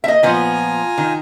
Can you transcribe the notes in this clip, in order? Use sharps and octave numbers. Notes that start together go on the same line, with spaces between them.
A#3 D#5 E5
A#2 F3 B3 F4 G#5 A#5
D#3